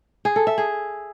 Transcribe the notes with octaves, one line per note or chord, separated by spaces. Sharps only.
G#4
A4
E5
G#4